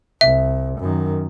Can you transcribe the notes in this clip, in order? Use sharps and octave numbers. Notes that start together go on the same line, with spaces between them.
C2 E5
F#2 D#3